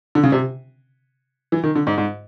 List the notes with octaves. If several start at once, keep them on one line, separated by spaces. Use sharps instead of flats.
D3
C#3
C3
E3
D#3
D3
G#2
G#2